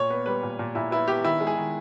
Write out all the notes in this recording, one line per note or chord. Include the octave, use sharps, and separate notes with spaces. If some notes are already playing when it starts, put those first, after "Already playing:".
Already playing: A#2 C#5
B3
G3 B4
A#2
A#2
A#2 E4
B3 E4
B3 G4
D#3 E4
G#3
G#4
D#3